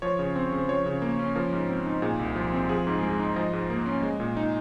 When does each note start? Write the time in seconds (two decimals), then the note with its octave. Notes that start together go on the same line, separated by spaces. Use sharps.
0.02 F3 C#5
0.19 C#3
0.36 C4
0.52 C#3
0.59 C5
0.68 F3 C#5
0.86 C#3
1.02 A#3
1.19 C#4
1.35 F3 A#4
1.53 G#2
1.69 C4
1.86 D#4
2.02 A#2 G#4
2.19 C2
2.36 F3
2.53 C4
2.69 F3 G#4
2.87 G#2
3.03 G#3
3.20 D#4
3.36 F3 D#5
3.53 G#2
3.70 A#3
3.86 C#4
4.03 G#3
4.20 A#2
4.37 D#4